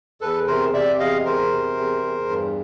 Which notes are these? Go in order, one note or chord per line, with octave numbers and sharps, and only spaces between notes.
E2 A4 B4
C3 A#4 C5
C3 D5 E5
E2 D#5 F5
E2 A#4 C5
C3
E2
E2
G2